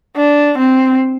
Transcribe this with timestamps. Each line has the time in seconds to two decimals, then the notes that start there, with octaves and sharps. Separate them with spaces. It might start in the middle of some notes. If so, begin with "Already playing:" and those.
0.17 D4
0.58 C4